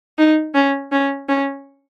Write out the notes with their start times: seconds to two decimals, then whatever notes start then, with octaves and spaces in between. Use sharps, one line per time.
0.18 D#4
0.55 C#4
0.92 C#4
1.28 C#4